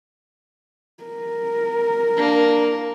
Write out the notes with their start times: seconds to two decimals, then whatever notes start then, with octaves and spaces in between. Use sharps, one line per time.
1.04 A#4
2.17 A#3 D4